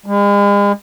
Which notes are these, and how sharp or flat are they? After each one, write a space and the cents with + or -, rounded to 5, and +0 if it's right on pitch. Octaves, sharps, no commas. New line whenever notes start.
G#3 -45